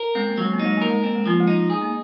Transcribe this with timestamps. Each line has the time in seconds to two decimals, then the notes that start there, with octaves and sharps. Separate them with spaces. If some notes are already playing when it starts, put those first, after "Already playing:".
Already playing: A#4
0.15 G#3 C4
0.28 A#3
0.38 F#3 G#3
0.53 A#3
0.60 D#4
0.65 G#3
0.77 A#3 A#4
0.90 G#3
1.02 A#3 C4
1.15 G#3
1.26 F3 A#3
1.40 G#3
1.48 D#4
1.70 G#4
1.81 A#3